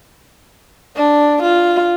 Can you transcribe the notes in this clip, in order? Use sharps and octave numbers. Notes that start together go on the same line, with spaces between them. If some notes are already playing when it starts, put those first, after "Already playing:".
D4
F4